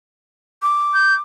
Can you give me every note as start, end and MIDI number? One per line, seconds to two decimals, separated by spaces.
0.62 1.20 86
0.94 1.14 91